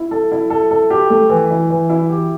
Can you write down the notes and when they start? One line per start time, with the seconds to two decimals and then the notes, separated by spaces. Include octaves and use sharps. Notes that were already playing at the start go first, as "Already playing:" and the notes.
Already playing: E4
0.11 A4
0.32 E4
0.50 A4
0.71 A4
0.90 G4
1.10 A3
1.29 E3
1.50 E4
1.70 E3
1.90 E4
2.09 G4